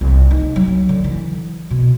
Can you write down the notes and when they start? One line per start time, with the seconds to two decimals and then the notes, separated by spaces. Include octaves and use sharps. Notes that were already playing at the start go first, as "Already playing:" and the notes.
0.01 C2
0.31 D#4
0.56 F#3
0.89 D3
1.04 E3
1.70 B2